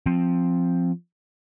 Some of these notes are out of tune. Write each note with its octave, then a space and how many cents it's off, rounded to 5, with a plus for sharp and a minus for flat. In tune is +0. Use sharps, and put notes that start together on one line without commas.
F3 +0 C4 +0